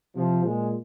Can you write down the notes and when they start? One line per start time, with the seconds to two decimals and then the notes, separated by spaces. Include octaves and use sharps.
0.16 C3 F3
0.44 A#2 G#3